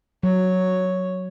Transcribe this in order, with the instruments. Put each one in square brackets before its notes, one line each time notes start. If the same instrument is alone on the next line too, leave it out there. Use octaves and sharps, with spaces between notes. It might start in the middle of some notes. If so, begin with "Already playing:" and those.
[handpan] F#3 [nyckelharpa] C#5